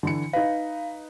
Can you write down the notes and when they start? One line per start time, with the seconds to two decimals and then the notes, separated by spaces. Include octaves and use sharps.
0.03 D3 E3 C#7
0.33 D#4 B4 F5